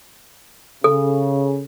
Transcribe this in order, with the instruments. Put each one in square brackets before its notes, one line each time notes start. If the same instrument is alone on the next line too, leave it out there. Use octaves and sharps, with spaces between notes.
[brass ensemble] C#3 [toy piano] A4